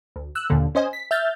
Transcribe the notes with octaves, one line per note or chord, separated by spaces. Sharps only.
D2
E6 F#6
D#2 A#2 D3
C#4 C5 D#5 G#5
B6
E5 F6 G6 A6